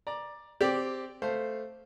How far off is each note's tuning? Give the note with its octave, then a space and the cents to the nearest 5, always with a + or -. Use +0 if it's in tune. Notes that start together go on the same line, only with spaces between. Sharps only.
D5 +10 A#5 +20
C4 +0 G4 +0 D5 -10
A3 +0 C5 -5 F5 +0